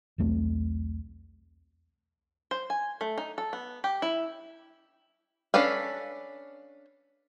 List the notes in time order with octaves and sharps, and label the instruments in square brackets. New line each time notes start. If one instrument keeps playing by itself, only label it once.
[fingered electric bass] B1 E2 A3 C4
[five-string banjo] C5
G#5
A3
D#4
A4
B3
G4
E4
C#4 D4 A4 B4 F5